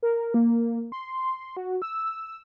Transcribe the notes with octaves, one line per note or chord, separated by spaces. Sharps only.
A#4
A#3
C6
F#4
E6